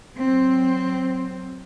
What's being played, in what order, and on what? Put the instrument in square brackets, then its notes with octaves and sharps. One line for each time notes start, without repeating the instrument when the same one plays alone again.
[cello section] F#3 C4